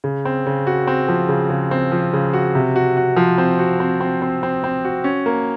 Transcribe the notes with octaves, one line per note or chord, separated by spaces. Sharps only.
C#3
C4
C#3
F#4
C4
F3
C#3
C#3
C4
F3
C#3
F#4
C3
F#4
F#4
F3
C4
F#4
C4
C4
C4
C4
C4
F#4
C#4
A#3